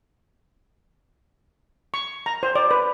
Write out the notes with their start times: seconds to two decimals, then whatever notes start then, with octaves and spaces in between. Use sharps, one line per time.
1.94 C#6
2.26 A#5
2.43 C5
2.55 D5
2.71 B4